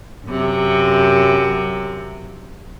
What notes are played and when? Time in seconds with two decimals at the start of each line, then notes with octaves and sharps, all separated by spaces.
0.28 F#2 C3